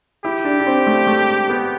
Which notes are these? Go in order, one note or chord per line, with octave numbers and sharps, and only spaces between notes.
E4 G4
D4
D4
C4
A3
A3
B3